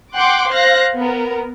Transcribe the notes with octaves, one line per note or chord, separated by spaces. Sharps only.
F#5 G5 C6 D6 F#6
C5 F5 F#6 A#6
B3 A#4